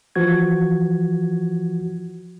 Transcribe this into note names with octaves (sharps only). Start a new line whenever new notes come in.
E3 F3 F#4 G#6